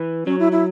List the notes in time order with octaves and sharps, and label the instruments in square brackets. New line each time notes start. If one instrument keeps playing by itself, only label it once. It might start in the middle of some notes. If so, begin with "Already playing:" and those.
Already playing: [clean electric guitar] E3
[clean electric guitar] F#3 [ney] C#4
[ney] E4
E4